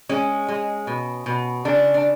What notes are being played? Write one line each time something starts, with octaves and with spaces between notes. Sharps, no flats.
G#3 C#4
G#3
B2
B2
C#3 D4
D4